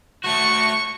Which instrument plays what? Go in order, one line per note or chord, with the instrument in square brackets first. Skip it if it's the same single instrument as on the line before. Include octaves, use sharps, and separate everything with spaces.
[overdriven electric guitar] A3 F#4 [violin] C#6